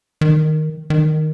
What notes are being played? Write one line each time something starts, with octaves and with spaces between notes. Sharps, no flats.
D#3
D#3